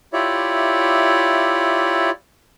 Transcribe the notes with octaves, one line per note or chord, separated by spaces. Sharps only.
E4 F4 G4 C#5 D5 E5